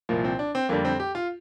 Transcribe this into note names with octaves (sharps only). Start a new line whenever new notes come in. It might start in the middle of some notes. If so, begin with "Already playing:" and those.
C2 A#2 F3 A#3
C4
D4
C4
F2 D3 G3 A#3
C4
G4
F4